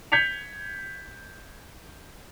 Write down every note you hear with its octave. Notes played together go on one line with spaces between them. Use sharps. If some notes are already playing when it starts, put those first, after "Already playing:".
G6 G#6 B6 C#7 F7